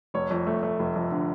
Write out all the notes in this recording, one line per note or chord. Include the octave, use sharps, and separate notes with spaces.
F1 C#5
F2
A3
A3
F1
F2
D3